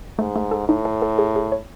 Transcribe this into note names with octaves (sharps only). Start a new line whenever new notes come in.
G#2 A3
A3
A4
A2 D#4
A4
A4
G#4
G#4
C#5